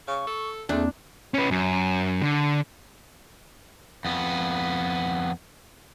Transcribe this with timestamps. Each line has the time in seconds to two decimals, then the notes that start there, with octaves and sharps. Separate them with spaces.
0.08 C#3 C#6
0.27 A4
0.69 E2 A3 A#3 C4 D4 G#4
1.34 C#4 B4
1.51 F#2
2.22 D3
4.05 F2 B3